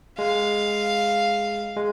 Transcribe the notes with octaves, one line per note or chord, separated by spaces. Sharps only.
G#3 F5
G#3